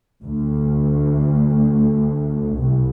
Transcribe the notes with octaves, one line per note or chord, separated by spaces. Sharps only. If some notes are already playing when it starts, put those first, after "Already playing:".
D2
C2